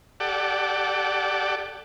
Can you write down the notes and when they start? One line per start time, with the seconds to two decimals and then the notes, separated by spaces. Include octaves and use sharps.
0.20 G4 A4 D5 F#5